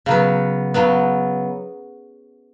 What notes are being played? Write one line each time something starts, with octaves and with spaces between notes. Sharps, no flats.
C#3 F#3 B3
C#3 F#3 B3